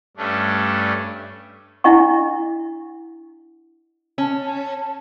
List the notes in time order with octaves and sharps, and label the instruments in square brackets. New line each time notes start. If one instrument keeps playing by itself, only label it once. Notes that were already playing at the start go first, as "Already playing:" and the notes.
[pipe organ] G2 A3 C#4 D4
[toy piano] D4 E4 D#5 F#5 C#6
[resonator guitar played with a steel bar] C#4 [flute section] A5